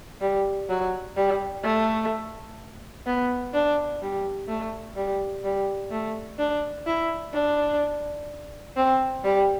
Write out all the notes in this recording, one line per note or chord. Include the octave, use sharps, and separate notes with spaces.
G3
F#3
G3
A3
B3
D4
G3
A3
G3
G3
A3
D4
E4
D4
C4
G3